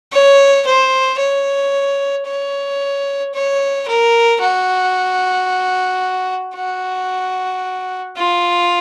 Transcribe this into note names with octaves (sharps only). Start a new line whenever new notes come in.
C#5
C5
C#5
C#5
C#5
A#4
F#4
F#4
F4